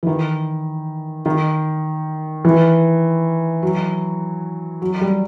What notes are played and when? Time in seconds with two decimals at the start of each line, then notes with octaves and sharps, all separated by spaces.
0.03 E3
0.07 D#3
1.26 D#3
2.45 E3
3.63 F#3
4.82 F#3
5.01 G3